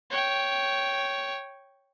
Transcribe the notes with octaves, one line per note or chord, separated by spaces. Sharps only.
C#5 G5